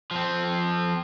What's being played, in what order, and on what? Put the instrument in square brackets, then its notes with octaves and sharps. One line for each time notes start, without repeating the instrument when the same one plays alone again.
[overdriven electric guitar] F3 C4